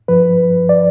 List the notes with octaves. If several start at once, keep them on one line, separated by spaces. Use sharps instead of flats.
G2 F3 B4
D5